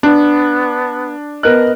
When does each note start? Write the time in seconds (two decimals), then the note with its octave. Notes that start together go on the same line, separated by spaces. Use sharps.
0.03 B3 D4
1.43 B3 A#4 D#5 F#6